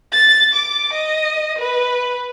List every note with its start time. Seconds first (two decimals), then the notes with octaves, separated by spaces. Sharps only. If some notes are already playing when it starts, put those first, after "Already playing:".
0.13 A6
0.53 D6
0.93 D#5
1.59 B4